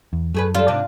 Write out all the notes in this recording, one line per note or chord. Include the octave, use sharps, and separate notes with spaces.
E2
F#2 A3 G#4 B4
G3 F4 A4
G#2 C3 D4